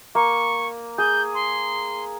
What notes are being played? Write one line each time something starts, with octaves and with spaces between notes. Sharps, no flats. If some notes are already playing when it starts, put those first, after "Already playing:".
A#3 C#6
G#4 G6
C6